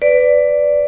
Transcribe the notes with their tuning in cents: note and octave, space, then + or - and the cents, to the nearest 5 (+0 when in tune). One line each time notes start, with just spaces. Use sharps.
B4 +15 D5 -5